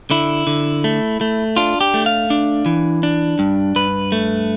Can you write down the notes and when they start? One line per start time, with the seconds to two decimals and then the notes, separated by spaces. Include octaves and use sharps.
0.10 D3 E4
0.47 D3
0.84 A3
1.21 A3
1.57 D4 F4
1.81 G4
1.94 A3
2.06 F5
2.30 D4
2.66 E3
3.03 D4
3.39 G2
3.76 G2 B4
4.12 A3